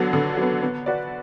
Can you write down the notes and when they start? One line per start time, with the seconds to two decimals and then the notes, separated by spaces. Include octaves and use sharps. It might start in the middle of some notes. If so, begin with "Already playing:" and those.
Already playing: D3 F#3 B3
0.13 D3
0.37 F#3 B3
0.62 B3
0.86 F#4 B4 D5